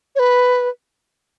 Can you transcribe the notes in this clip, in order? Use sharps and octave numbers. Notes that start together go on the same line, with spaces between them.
C#5
B4